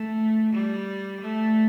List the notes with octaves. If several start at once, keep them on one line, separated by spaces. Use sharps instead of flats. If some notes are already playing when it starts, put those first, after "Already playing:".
Already playing: A3
G3
A3